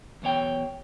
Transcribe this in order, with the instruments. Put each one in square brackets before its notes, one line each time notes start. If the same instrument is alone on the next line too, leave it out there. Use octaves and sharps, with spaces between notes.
[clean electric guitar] B1 E2 B2 C#5 G5